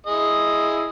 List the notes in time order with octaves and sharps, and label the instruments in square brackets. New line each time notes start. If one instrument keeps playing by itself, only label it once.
[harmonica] E4 G#4 D#5